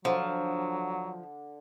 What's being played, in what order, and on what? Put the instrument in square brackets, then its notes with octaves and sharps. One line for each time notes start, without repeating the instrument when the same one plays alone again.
[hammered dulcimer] D3 [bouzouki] F3 [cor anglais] F#3